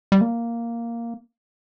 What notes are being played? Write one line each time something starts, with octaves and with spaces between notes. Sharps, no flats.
G3
A#3